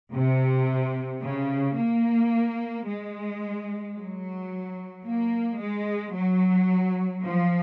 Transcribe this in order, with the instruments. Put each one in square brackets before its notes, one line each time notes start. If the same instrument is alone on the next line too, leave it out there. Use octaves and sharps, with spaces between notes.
[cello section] C3
C#3
A#3
G#3
F#3
A#3
G#3
F#3
F3